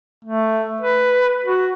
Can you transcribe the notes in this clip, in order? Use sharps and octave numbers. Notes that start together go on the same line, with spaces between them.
A3
B4
F#4